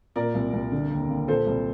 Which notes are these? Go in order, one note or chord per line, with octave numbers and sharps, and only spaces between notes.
A#2 A#4 D5
C2
C2
D3
D#2
D#2
A#2 A4 C5
C2